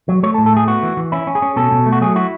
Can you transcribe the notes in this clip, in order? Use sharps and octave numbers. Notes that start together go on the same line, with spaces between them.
F#3
A3 C#5
A4
A2
A4
A3 G#4
B3 F#4
E3
E3
C#4 E4
C#4
G#4
C#4
B2 A4
B2
A3
F#4
F#3 G#4
E4 F#4